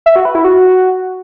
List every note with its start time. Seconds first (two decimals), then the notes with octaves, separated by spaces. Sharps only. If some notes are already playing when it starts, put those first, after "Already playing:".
0.06 E5
0.16 F#4
0.25 B4
0.35 E4
0.44 F#4